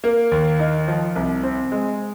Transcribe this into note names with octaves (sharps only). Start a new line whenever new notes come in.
A#3
D#2
D#4
F3
C2
C4
G#3